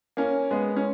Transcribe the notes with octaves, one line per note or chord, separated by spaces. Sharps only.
A#3 C#4
G#3 B3
C#4